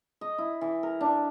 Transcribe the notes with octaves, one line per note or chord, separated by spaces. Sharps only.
D#5
E4
E3
A#4
D4